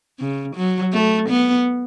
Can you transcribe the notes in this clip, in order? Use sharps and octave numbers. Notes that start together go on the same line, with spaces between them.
C#3
F#3
A3
B3